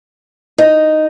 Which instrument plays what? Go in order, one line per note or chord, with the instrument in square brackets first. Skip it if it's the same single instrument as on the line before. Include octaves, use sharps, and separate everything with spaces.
[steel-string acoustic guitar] D#4